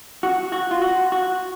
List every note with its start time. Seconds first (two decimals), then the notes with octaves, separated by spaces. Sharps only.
0.23 F#4
0.52 F#4
0.71 F4
0.82 F#4
1.12 F#4